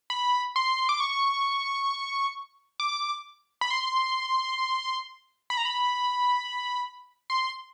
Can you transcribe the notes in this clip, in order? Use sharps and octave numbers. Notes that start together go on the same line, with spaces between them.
B5
C6
D6
C#6
D6
B5
C6
B5
A#5
B5
C6